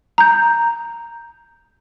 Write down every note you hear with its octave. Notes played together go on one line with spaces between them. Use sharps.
A#5 G6